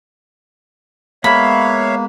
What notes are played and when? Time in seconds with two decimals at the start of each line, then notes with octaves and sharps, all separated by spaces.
1.24 G#3 A#3 B3 C#5 E5 F5 B5